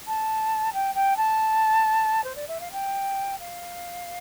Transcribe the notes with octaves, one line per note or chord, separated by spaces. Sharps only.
A5
G5
G5
A5
C5
D5
E5
F5
G5
F5